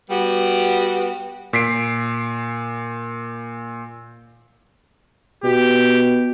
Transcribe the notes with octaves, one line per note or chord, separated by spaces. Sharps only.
G3 B3 F#4 G4
A#2 B6 C7 D7
B2 G4